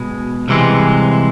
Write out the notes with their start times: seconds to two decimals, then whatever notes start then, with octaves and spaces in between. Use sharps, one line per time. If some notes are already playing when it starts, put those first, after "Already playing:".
Already playing: B2 G#3
0.48 C2 C3 E3 G#3